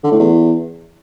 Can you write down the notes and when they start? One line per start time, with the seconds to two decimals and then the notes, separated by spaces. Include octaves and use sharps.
0.04 D3
0.11 A2
0.19 E2